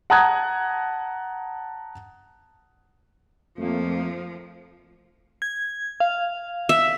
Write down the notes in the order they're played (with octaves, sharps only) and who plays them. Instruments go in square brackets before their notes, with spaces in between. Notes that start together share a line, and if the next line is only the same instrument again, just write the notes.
[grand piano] F#5 A5 A#5 D#6 F#6 G#6
[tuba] F2 [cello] F3 [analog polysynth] A3 A#3
[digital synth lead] G#6
F5
[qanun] E5